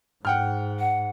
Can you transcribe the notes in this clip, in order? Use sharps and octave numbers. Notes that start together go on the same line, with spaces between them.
G#2 F#5 G5 F6
F#5